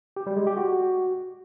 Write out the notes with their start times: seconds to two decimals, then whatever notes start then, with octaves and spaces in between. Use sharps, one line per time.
0.16 G4
0.27 G3
0.37 G#3
0.47 G4
0.57 F#4